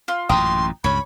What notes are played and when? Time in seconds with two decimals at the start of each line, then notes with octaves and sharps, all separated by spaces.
0.08 F4 C6
0.29 A1 F#2 A#2 G5 A#5 C6 D#6
0.84 C#2 G2 C#5 B5